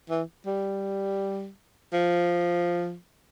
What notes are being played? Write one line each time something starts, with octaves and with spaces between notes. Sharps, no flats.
E3
G3
F3